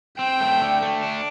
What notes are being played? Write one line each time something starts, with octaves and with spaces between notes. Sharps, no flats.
C4 G5
A3
D3
A3
D4